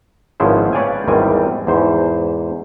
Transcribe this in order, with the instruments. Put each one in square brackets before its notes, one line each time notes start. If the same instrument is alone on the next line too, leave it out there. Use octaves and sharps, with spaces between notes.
[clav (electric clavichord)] G#1 C#3 F3 B3 E4 C5
B4 C#5 D5 F5 G5 G#5
G#1 E2 D#3 G3 C4 G#5
E2 G#2 C5